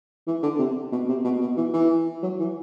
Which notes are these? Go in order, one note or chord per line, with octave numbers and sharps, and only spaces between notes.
E3
D3
C3
B2
C3
B2
B2
E3
E3
F#3
E3